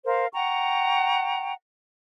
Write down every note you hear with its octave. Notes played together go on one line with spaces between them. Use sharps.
A#4 C5 F5
F#5 G5 A#5 C#6